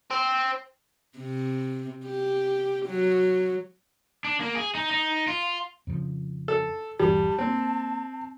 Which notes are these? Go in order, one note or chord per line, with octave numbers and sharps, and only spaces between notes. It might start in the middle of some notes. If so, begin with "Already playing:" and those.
C4
C3
G4
F#3
D4
A#3
G#4
D#4
D#4
F4
F2 C#3 F3
A4
D#1 G2 E3 G3 A5
A#3 C4